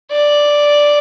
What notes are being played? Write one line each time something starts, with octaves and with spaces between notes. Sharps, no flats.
D5